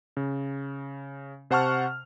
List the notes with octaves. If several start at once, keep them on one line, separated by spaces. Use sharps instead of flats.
C#3
C3 C5 F#5 A5 C#6 F6